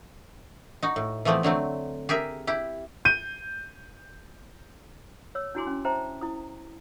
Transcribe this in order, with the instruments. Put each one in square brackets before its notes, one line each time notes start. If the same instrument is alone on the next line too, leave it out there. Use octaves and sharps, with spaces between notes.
[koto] D#4 F#4
A2
E3 F3 A3 B3 C4
D3 F#3 A3 C4
G4 G#4 A#4 E5
E4 G4
[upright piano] G6 D#7
[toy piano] C#5 E6
D4 E4 F#4 G#5 C6 D6
C#4
C5 E5 G5 A5 A#5
E4 D#6